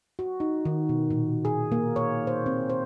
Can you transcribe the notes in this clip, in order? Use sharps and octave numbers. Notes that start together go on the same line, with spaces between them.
F#4
D#4
D#3
B2
A#2
G#4
A#3
C#5
C5
C4
C5